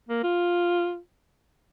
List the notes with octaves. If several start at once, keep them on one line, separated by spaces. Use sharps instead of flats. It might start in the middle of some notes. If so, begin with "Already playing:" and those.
A#3
F4